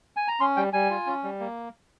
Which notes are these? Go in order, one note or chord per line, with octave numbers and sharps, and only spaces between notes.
G#5
A#5
C#4 C6
G3 G5
G3 G#5
F4
C#4
G3
A#3